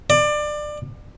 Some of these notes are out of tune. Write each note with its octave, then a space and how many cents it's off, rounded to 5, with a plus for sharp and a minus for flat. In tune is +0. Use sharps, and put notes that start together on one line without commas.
D5 +25